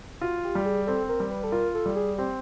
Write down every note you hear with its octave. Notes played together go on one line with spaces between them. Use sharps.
F4 F#4
G4
G3
G#4
C4 A4
A#4
G3
B4
A4
F4 A#4
A4
G3
G#4
C4 G4